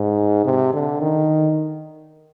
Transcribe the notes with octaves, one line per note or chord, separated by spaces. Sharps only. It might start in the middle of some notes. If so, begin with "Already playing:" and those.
Already playing: G#2
C3
D3
D#3